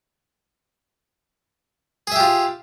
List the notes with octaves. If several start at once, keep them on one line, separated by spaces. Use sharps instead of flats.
F4 G4 G#4 E5